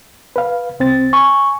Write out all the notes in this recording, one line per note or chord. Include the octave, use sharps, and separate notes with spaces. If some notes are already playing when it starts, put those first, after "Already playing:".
B4 F5
C2 C4 A6
G#5 C#6